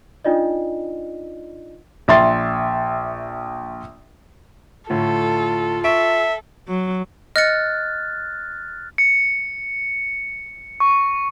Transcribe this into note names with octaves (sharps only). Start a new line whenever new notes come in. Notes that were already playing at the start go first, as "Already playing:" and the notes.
D4 D#4 F4 D5 D#5
A#1 E5 C6 A6
A2 D3 A3 F4 A4
A4 E5 C#6 D7
F#3
D#5 F6 F#6 A6 C#7
C#7
C#6